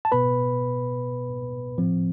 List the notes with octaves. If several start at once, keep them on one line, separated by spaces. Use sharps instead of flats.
A5
B2 B3 B4 B5
A2 F3 C4